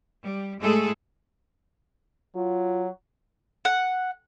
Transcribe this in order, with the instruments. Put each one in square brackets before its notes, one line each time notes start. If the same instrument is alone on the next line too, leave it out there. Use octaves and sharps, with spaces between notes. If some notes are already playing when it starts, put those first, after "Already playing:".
[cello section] G3
A2 G#3 A3 G#4 A4
[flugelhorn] F#3 [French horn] F4
[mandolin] F#5